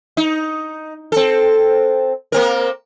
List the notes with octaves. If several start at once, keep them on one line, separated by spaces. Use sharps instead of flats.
D#4
C4 A4
A#3 C4 A#4